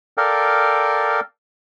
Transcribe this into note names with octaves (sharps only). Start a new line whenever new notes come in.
A4 A#4 D5 F5 G5